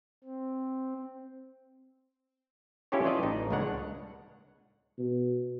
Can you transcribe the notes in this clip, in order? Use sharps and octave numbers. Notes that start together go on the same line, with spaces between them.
C4
C#4 E4 F4 G4 A4 C#5
E3 F4 D5 D#5 A5
A1 D#4
C#2 C#3 A#3 D4 C#5 F#5
B2